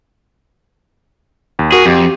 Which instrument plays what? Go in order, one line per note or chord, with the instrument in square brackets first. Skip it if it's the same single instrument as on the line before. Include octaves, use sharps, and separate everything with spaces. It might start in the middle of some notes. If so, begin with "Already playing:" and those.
[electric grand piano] D#2
[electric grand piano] F#4 A#4 [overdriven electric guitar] G#4
[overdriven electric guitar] F2 [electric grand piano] G4